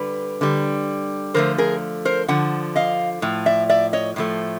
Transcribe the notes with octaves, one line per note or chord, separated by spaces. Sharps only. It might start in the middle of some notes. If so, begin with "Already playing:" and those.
Already playing: D3 G3 B4
D3 G3
D3 F3 A3 A#4 C5
G#4 A#4
A#4 C5
D3 F3 F#5
D#5 F5
A2 F3
D5 E5
D5 E5
C#5 D#5
A2 F3 A3